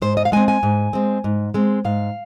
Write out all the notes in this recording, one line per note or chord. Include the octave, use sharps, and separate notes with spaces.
G#2 C5
D#5
F5
G#3 C4 G#5
G#5
G#2
G#3 C4
G#2
G#3 C4
G#2 F5